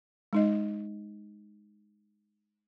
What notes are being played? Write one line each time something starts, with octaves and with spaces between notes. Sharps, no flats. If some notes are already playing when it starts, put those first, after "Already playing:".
G#3 D#4 D#5